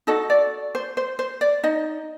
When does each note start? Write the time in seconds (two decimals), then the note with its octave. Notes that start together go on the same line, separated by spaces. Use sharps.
0.07 D#4 F#4 A4 D#5
0.30 D5
0.75 C5
0.97 C5
1.19 C5
1.41 D5
1.63 D#4 D#5